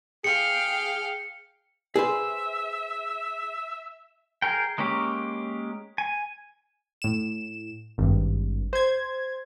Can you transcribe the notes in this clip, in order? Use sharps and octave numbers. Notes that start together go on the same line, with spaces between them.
G#4 F5 G5 C#7
G#4 B4 C5 E5
G#4 A#4 G5
G#3 A#3 C#4 G4
G#5
A2 E7
G#1 G2
C5 G#6